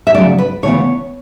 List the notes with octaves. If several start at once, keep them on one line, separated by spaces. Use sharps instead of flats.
E5
D2 C#3 F#3 D5
B4
D2 C#3 E3 B3 C#5